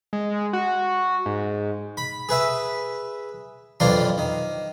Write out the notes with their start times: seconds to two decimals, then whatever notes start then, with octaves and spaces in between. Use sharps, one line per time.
0.13 G#3
0.53 F#4
1.26 G#2
1.97 B5
2.29 G#4 B4 E5
3.80 F2 E3 F#3 D4 F4 C6
4.18 D#3